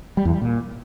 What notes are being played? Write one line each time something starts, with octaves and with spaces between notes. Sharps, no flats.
G3
E2
G3
A#2